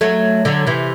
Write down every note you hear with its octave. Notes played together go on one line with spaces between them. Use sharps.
F#3 A3
D3 F#3
C3 E3